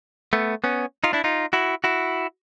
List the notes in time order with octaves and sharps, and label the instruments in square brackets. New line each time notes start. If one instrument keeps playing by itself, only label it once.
[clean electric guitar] A3 B3
B3 C#4
D#4 F4
D4 E4
D#4 F4
E4 F#4
E4 F#4